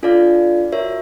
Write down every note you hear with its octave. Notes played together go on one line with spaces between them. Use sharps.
D4 F4 A4 D5 F5
F#4 A#4 C#5 E5